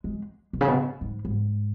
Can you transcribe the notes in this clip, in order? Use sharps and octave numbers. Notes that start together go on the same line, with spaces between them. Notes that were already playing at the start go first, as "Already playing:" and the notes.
G#3
B2
C#3
B2
G#2
G#2